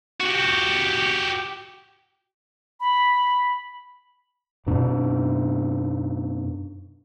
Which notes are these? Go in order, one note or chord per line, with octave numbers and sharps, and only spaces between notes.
F#4 G4
B5
F#2 B2 D4